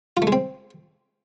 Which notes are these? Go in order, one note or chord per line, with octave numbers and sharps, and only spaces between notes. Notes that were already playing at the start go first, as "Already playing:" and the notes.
F4
A3
G#3
C4